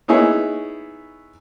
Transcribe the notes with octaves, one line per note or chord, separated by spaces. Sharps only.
B3 D#4 E4 G#4 C#5